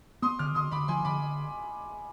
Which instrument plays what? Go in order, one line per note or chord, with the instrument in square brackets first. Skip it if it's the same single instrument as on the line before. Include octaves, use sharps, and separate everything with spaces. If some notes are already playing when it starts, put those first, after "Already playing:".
[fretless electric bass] B3 [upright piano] C6 D#6
[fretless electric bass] D3 [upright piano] D6 F6
[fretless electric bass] D3 [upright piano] C6 D#6
[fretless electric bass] D3 [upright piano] B5 D6
[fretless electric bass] F3 [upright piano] G#5 C6
[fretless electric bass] D3 [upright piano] B5 D6